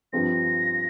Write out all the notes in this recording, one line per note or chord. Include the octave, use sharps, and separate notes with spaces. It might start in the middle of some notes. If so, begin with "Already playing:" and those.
G2 F3 C4 F4 A#6